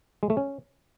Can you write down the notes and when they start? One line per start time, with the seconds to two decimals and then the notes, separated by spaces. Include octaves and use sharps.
0.23 G#3
0.30 A3
0.37 C#4